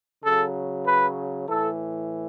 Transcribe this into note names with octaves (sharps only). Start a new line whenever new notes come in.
C#3 F#3 A4
B4
A2 E3 A4